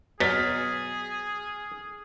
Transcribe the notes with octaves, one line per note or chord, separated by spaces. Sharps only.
B2 F#3 G#4 F6 A6 B6